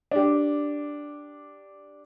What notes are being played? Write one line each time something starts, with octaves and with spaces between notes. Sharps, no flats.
D4 G4